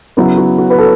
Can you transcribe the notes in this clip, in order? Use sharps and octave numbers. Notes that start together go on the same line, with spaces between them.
C#3 F#3 B3 E4
F#4
F#4
B4
A4